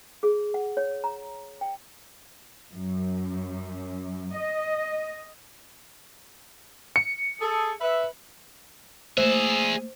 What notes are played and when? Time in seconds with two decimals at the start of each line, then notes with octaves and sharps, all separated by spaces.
0.23 G#4
0.54 F#5
0.77 C#5
1.04 A#5
1.61 G5
2.73 F#2
4.35 D#5
6.96 C#7
7.41 G#4 A4
7.81 B4 E5
9.17 A3 A#3 G#4 C5 E5